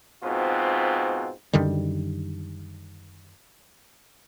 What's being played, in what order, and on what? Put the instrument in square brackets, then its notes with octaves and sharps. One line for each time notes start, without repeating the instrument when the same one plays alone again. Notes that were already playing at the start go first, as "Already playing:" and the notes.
[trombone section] G#2 B2 C4 F4 F#4
[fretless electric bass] F#2 D3 D#3 G3